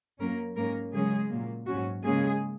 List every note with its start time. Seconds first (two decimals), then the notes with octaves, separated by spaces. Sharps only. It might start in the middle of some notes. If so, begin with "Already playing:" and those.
0.19 F#2 F#3 A#3 C#4 A#4
0.56 G#2 G#3 A#3 C#4 A#4
0.93 C#3 F#3 G#3 C#4 G#4
1.30 A#2 F#3 A#3
1.67 G#2 F#3 C#4 F#4
2.04 C#3 G#3 A#3 C#4 G#4